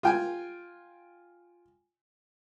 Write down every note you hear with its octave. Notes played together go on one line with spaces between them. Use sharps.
F4 G5 G#5